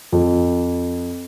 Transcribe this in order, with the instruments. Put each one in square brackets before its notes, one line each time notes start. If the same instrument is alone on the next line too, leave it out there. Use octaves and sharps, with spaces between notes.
[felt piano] F2